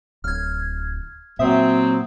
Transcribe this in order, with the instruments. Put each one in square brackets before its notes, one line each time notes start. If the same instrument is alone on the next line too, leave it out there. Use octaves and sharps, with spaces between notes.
[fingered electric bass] D1 [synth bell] F6 G#6
[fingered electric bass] A#2 [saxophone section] F#3 C4 [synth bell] E5 D#6